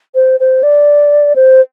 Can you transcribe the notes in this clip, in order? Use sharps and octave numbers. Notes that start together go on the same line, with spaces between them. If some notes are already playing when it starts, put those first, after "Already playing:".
C5
C5
D5
C5